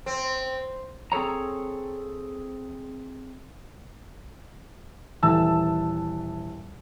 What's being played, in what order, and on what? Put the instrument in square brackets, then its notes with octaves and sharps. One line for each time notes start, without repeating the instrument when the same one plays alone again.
[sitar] C4
[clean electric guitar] C4 G#4 A4 C#5 A#5
[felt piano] D#1 E3 A4 A5 E6